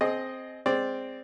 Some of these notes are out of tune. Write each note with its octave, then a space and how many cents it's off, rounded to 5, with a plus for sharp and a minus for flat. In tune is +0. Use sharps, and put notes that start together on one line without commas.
C4 +0 G#4 +35 D#5 +0
G#3 -10 C4 +0 D5 +0